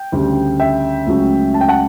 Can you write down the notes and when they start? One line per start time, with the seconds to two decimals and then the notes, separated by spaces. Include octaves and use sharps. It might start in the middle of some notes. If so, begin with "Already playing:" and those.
Already playing: G5
0.12 D2 C#3 G3
0.60 E5 G5
1.07 C#2 C#3 F#3 A3
1.54 A5
1.61 G5
1.68 F#5 A5